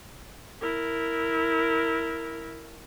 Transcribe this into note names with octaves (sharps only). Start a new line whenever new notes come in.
E4 A#4